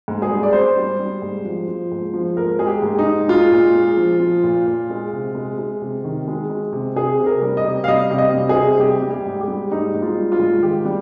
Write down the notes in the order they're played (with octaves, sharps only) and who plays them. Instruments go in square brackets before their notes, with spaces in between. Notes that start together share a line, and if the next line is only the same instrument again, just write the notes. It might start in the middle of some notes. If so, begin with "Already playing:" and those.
[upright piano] G#2
G#4
G3
D5
G3 C5
G3
G3
G#2
F3
F3
G#2
F3
G#2 A#4
G#3 G#4
G4
G#2
D#4
G#2
G#3 F4
A#2
G#3
F3
F3
A#2
A#2
G#3
C3
G#3
G#3
C3
D#3
G#3
G#3
C3
C3 G#4
C3
A#4
G3
D#5
C3
F5
G3 D#5
C3
D#5
G3
G#4
C3
G3 G4
G3
G4
G#2
G4
G3
G#2 D#4
G#2
F4
G3
F4
G#2
D#3 G4
G3